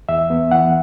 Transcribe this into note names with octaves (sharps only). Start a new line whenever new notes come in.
E2 E5
B3
E3 F#5